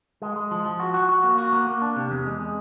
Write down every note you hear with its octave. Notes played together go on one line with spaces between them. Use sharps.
G#3
G#3
F3
F3
F#4
F#4
F#4
A#3
F#4
A#3
A#3
D4
C3
E2
G#3
G#3